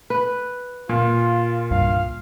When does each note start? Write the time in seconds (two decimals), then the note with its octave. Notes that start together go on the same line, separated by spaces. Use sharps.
0.10 B4
0.89 A#2 F4
1.71 C2 G2 F5